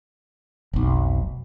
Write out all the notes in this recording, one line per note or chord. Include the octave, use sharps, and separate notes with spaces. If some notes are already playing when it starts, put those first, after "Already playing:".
F1 B1